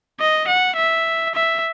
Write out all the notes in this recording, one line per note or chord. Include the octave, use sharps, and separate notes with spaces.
D#5
F#5
E5
E5